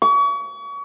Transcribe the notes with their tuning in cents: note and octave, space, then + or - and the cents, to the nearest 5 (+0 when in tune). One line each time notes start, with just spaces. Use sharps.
C#6 +35